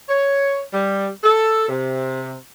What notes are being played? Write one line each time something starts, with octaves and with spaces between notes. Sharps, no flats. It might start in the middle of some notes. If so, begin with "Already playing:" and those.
C#5
G3
A4
C3